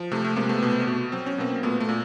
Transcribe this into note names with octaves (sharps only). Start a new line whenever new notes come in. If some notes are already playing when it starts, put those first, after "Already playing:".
Already playing: F3
C3 A3
A3
C3 G#3 A#3
A3 B3
B2
B2
F#3 C4
C#4
B2 A#3 C4
A#2 A3 B3
A3
A#2